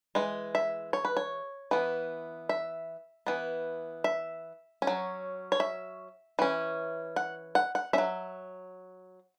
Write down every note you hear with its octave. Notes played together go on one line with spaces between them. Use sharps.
E3 G#3
E5
C#5
B4
C#5
E3 B3
E5
E3 B3
E5
C#4
F#3
C#5
E5
E3 C#4
F#5
F#5
F#5
F#3 C#4 E5